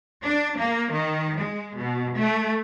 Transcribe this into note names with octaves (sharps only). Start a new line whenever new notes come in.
D4
A#3
D#3
G#3
B2
A3